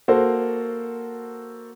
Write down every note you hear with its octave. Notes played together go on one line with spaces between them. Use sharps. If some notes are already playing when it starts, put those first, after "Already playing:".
A#3 F#4 A4 C5